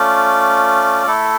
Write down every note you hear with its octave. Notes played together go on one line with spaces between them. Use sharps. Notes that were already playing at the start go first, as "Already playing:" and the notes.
Already playing: A3 C#4 F4 D5
A3 E4 A4